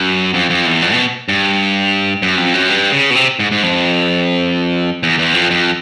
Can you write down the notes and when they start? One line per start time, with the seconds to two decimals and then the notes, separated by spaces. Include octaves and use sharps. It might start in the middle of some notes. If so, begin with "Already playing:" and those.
Already playing: F#2
0.34 F2
0.50 F2
0.66 E2
0.82 F2
0.93 B2
1.29 G2
2.22 F#2
2.37 F2
2.54 F#2
2.69 G2
2.92 C#3
3.10 B2
3.16 C3
3.39 G#2
3.51 G#2
3.63 F2
5.03 E2
5.19 E2
5.34 F2
5.51 F2